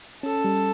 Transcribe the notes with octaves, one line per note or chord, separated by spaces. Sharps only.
C#4 A4
G3